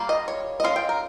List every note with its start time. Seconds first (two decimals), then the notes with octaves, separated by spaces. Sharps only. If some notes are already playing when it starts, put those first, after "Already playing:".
Already playing: G3 A#3 F4
0.09 D#5
0.28 C#5
0.60 D#5
0.64 G#3 C#4 F4 F5
0.76 G5
0.89 A#4